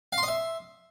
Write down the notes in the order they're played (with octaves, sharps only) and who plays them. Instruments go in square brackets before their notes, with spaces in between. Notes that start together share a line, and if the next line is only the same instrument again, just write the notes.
[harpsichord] F5
C6
D#5
E5